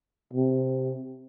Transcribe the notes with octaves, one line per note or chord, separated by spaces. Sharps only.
C3